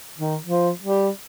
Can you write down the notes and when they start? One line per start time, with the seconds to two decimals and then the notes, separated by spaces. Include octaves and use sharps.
0.18 D#3
0.43 F3
0.82 G3